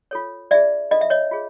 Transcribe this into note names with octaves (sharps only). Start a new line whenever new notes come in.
F4 A4 C#5
D4 F4 G#4 D5 E5
D4 F4 A4 D#5
E5
C#5 D#5
F4 G#4 C#5